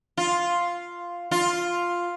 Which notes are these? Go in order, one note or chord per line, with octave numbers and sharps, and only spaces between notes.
F4
F4